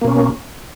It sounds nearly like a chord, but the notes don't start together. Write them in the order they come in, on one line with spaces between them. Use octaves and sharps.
A#3 B2 C#4